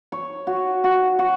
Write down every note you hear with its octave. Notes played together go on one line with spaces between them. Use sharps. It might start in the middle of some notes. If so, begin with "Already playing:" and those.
C#5
F#4
F#4
F#4